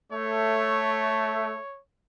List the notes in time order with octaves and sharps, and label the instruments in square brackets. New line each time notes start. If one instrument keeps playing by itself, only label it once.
[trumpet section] A3 [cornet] C#5